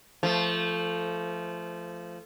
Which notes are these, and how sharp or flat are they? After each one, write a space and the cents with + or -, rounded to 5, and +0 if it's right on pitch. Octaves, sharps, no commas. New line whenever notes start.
F3 -15 A3 +0